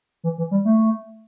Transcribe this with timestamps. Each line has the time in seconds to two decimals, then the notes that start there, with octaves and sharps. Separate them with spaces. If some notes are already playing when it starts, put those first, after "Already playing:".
0.24 E3
0.38 E3
0.51 G3
0.65 A3